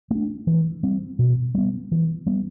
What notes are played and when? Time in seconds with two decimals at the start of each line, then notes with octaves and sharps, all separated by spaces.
0.11 A3 D4
0.47 E3
0.83 G3 C4
1.19 B2
1.54 G3 B3
1.92 E3
2.26 G3 B3